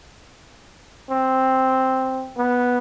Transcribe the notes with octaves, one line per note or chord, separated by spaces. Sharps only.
C4
B3